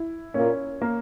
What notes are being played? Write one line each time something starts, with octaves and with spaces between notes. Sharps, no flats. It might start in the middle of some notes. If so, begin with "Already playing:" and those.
Already playing: E4
A#2 C#4
A#3